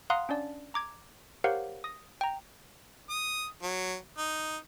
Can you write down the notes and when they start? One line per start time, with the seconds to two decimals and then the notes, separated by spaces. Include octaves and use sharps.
0.10 F5 F#5 A#5 C6 D#6 F#6
0.29 C#4 D4 D5 A5
0.74 A#5 D6 G#6
1.44 G4 A#4 C5 C#5 F5 F#5
1.84 D#6 A#6
2.21 G5 A#5
3.10 D#6
3.62 F#3
4.18 D#4